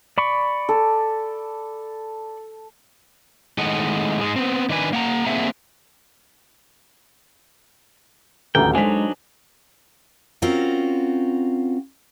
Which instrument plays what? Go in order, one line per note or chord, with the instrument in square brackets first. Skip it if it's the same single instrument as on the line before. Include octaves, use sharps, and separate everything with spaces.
[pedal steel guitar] D5 B5 C#6
[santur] A4
[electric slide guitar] A2 D#3 G#3 D#5 F#5
G#2 G#3
B3 C4
D#3 D4 B4 G#5
A#3 F#5 A#5
D3 A#3 C4 G#4 E5 F#5
[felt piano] D#1 A1 D2 [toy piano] A4 B4 [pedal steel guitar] G5 [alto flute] A#5
[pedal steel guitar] F#3 D4 D#4 [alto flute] G#3 [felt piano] C5 B6 [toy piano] G#5
[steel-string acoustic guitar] C4 C#4 F4 F#4 A#4